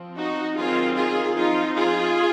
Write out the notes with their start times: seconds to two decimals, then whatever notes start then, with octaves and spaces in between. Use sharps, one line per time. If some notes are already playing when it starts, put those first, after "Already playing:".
Already playing: F3 C4
0.18 D#4 F#4
0.57 D#3 F#3 C4 D#4 F4 G#4
0.96 F4 G#4
1.36 F3 C4 D#4 F4
1.76 F4 G#4